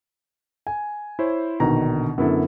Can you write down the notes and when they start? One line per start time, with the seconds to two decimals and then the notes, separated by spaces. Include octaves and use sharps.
0.67 G#5
1.19 E4 C5 C#5
1.60 A#1 B2 D3 D#3 D#4 A#5
2.18 F#2 D3 B3 E4 A4